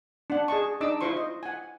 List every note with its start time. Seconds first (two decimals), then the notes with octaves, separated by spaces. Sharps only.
0.30 D4 F#5
0.48 G#4 D#5 A5 C#6
0.81 D4 D#4 D#5 D6 E6
1.01 E4 F4 C5 C6 C#6
1.17 D#5
1.43 F#5 G#5